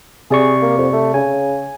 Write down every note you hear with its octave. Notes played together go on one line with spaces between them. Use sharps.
C3 G#4 D5 C#6
A#3
F2
A3
C#3 G#5